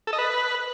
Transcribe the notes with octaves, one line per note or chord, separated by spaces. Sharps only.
A4
D#5
B4